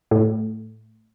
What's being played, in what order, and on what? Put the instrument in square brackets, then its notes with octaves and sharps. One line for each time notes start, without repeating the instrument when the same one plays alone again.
[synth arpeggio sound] A2